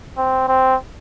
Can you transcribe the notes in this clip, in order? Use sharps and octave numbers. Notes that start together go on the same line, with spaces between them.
C4
C4